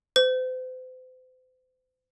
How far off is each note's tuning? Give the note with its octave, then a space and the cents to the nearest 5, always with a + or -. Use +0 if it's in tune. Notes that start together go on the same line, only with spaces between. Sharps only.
C5 -40